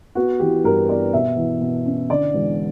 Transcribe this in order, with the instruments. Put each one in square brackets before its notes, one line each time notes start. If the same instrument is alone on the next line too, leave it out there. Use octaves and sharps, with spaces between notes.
[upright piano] B3 F#4
E3 G4
G2 A#4
B3 D5
B2 E5
E2
B2
C#4
D3 D5
E1